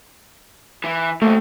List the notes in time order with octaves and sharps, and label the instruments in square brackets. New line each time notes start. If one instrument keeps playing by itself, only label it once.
[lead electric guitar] E3
[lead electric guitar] F2 A#2 [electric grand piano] A3